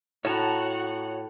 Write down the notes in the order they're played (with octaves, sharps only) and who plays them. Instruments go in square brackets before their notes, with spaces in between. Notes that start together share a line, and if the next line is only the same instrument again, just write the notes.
[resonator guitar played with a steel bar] A2 [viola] F#4 F#5 [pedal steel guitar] C#5 A5 A#5